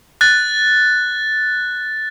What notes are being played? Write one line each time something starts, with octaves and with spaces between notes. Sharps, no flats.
F#6 A6